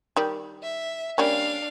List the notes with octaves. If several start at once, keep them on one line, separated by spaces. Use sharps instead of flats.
D#3 G3
E5
G3 A#3 C#4 D4 F5